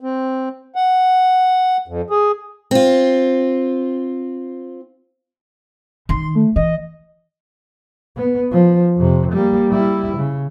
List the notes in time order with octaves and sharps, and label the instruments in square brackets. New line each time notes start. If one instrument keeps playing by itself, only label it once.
[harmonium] C4
F#5
F2
G#4
[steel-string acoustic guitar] C4 F4
[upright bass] D#3 [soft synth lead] C6
[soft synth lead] A3
[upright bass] E3 [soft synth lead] D#5
[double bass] B3
F3
F2 C3
G3 A#3
G3 E4
C#3